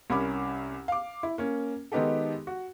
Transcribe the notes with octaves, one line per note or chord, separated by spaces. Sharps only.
C2 C#4 A#4 B5 D6
F5 D6
E4
A#3 C#4
D#3 G#3 B3 D#4 G4 A4
F#4